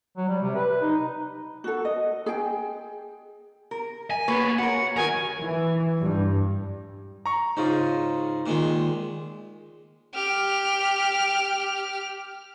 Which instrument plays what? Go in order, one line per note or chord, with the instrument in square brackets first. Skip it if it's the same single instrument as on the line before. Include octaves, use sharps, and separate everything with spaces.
[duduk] F#3
G3
C3
B4
D#4
[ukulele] F#4 A4
D#5
G#4 G5
[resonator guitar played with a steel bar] A#4
[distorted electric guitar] G#5
[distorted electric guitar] A#3 B3 [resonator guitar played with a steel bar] G#4 B4 [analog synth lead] C#5
[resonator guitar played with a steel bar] F#4 A#4 [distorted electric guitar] F#5
[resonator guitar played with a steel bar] D#3 F#3 F#4 [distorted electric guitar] A#4 [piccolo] G#5
[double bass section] E3
G2
[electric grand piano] A#5 C#6
[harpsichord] G#2 C#3 [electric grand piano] D#4 F4
[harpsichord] A#2 D#3 G#3
[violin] G4 F6